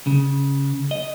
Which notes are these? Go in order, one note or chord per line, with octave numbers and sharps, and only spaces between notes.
C#3
D#5